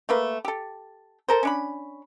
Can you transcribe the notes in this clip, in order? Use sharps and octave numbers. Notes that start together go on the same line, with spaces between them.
A3 A#3 B4
G4 A4
A4 A#4 C5
C#4 D4 B5